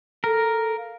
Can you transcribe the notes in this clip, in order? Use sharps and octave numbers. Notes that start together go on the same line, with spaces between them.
A4 A#4
F5